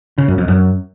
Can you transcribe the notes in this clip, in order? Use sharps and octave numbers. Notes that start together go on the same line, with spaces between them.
C#3
F#2
F2
F#2